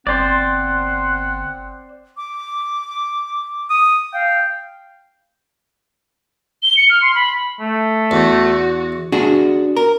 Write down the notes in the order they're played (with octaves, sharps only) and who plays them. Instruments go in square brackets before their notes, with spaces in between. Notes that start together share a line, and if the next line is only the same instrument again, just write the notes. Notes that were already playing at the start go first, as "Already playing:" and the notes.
[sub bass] G1 [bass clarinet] C4 [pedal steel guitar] C5 D5 [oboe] F#5
[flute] D6
[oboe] D#6
[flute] F5 [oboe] G5
[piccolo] G7
C#7
F6
C6
B5
[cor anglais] A3
[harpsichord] E2 [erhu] F#4
[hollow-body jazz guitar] D4 F#4 G#4
A#4